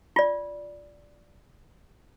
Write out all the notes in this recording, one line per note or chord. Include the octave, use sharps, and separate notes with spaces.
F4 D5